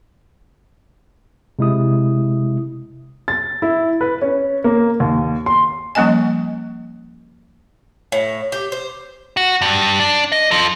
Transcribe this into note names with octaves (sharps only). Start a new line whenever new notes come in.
C3 G#3 E4 D#6
A6
E4
B4
C#4
A#3
D#2
C6
F3 G3 A#3 C#4 D#5 G#5
A2
G4
C5
F#4
G2
D4
D#5
F4 A4